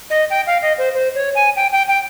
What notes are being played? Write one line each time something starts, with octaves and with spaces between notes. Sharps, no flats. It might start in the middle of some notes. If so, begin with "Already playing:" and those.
D#5
G5
F5
D#5
C5
C5
C#5
G#5
G5
G5
G5